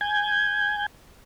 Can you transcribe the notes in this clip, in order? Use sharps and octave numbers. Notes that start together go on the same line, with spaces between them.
G#5 G6 G#6